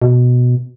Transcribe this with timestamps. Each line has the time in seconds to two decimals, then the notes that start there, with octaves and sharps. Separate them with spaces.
0.02 B2